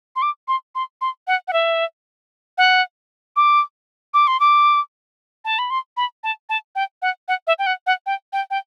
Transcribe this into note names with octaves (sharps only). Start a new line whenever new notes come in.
C6
D6
C6
C6
C6
F#5
F#5
E5
F#5
D6
D6
C6
D6
A5
B5
C6
B5
A5
A5
G5
F#5
F#5
E5
G5
F#5
F#5
G5
G5
G5